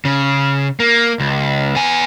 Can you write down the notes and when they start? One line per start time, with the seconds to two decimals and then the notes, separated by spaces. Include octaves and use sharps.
0.05 C#3
0.80 A#3
1.20 C#2
1.75 B3 G#5